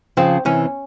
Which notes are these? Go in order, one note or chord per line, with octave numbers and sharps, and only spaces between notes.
C#3 F3 C4
C3 E3 C#4